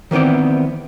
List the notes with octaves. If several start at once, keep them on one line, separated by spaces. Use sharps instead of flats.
D#3 E3 B3 C4 D5